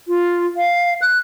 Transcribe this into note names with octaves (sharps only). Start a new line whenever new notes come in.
F4
F5
F#6